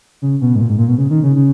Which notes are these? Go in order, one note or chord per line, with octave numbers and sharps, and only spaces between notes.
C#3
B2
G#2
A#2
G#2
A#2
B2
C#3
D#3
C#3
C#3